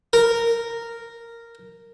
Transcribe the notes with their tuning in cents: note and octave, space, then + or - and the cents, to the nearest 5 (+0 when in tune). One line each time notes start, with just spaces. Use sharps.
A#4 -5